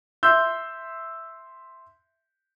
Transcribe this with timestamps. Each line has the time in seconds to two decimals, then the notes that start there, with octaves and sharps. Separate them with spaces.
0.23 E5 C6 E6 G6